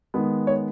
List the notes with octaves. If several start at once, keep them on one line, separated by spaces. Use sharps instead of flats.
D#3 G#3 B3
C#5